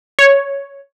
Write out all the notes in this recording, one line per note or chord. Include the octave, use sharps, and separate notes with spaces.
C#5